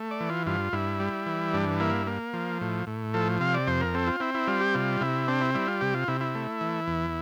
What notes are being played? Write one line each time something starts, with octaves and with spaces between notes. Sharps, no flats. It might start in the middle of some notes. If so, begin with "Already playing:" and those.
Already playing: A3
D5
E3
F4
G2 F4
G2 E4
G3
E3
G2 D4
A#3 E4
A#3
F3
A2
A2
F3 A4
C3 F5
D5
F2 C5
A#4
C4 A4
F4
C4 E4
E4
G3 F4
G4
C3 F4
C3 E4
C4 D4
E4
G3 E4
F4
C3 G4
F4
C3 E4
E4
A3
E3
E2